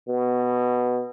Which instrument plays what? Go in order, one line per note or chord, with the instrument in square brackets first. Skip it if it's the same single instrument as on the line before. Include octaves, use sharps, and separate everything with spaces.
[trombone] B2